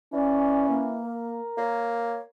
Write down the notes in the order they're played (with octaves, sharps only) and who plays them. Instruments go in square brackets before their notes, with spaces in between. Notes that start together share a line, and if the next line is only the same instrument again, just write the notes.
[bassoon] E3 [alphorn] C#4 [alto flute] D5
[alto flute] A#3
[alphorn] A#4
[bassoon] A#3 [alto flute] C#5